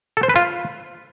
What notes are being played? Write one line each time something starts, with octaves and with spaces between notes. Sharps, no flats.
A4
C5
B4
F4